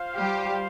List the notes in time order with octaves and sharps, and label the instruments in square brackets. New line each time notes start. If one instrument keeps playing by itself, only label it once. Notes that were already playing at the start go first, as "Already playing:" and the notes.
Already playing: [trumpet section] F4 C5 F5
[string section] G3 G4